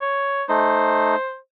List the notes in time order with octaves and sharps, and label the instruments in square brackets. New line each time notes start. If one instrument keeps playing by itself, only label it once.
[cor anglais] C#5
[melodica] A3 D#4 [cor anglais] C5